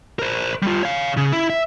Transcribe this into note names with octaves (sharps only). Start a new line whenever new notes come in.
A#4 C5
G3 F4
C#5 F5
C#3
E4
E5